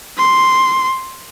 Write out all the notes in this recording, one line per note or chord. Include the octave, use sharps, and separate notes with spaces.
C6